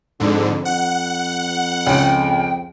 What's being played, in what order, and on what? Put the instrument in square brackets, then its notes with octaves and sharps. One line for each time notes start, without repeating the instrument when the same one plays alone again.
[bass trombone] F2 [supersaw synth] G#2 D3
[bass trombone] F2 [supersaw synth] F#5
[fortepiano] C#2 C#3 [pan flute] G5